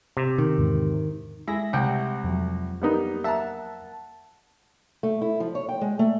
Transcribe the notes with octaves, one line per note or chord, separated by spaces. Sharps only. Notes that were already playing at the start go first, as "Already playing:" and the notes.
C3
B2 D#3
E2 G#2 D3
G#3 E4 G#4 E5 A#6
C2 F#5 G5
F2 F3 F#3
G3 A#3 B3 D#4 A#4
E5 F#5 A5 A#5
A3
E4
F3
C#5
G5
G#3
A3